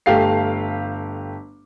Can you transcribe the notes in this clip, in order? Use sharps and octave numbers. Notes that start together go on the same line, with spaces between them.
G1 A3 G4 F5 C7